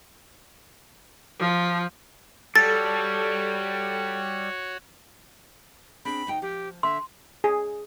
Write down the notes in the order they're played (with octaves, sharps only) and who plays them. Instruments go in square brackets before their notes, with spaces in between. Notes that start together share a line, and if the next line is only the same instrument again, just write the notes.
[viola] F3
[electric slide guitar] G3 [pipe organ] F#4 C#5 [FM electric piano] A4 [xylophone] A6
[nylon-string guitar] C4 D4 G#4 [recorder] B5
[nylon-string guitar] D2 D#4 G5
[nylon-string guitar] F3 [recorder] G4
[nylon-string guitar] D3 [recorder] E5 [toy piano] C6
[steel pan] G#4